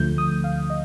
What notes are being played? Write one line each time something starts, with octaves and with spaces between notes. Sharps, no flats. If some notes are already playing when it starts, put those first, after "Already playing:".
Already playing: D2 D3 F3 A3 G6
D#6
F5
D#5